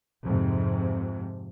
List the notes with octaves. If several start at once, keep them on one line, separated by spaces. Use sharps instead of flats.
F2 G#2 C3